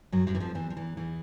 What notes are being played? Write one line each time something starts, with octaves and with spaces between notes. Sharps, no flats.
F#2 F#3
F#2 F#3
E3
F2 F3
E2 E3
F3
E2 E3
E2 E3